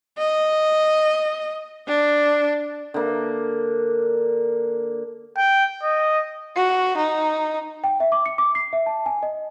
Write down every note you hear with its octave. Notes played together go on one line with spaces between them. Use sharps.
D#5
D4
D3 A#3
G5
D#5
F#4
D#4
G5
E5
D6
C#7
D6
C7
E5
A5
G#5
D#5